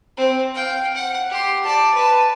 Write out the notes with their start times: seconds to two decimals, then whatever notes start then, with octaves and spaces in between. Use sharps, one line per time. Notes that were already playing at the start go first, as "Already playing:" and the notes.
0.18 C4
0.55 F5 G5
0.95 F#5
1.30 G4 C6
1.64 D5 A5
1.94 B4 A5